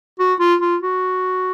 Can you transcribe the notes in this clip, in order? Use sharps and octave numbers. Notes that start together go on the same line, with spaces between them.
F#4
F4
F4
F#4